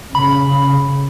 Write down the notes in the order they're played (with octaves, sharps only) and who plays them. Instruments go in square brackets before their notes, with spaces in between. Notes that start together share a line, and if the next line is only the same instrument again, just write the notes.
[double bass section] C#3 [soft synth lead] B5